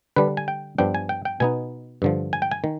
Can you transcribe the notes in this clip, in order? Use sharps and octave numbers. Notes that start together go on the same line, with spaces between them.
D3 G3 D4 B4
G#5
G5
G2 F3 B3 D4 G5
G#5
G5
G5
B2 B3 D#4 G#5
G2 D3 F3
G#5
G5
G#5
D#3